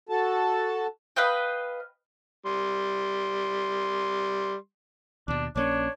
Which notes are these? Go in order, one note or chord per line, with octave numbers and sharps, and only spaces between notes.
F#4 A4 A5
B4 D#5 F5 G5
G3 C6
D#2 B2 D4
A#1 A#3 C#4 D4 C#5